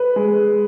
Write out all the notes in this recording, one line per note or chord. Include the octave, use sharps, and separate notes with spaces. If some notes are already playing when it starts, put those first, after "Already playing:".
Already playing: B4
G#3